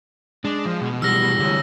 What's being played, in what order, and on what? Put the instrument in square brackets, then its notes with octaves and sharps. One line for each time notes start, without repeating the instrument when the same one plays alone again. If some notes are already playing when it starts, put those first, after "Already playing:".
[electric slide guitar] G#3 [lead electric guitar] D4
[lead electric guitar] F3
B2
[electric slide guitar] E3 G3 G#3 [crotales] E6 F6 A#6
[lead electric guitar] D3 C#5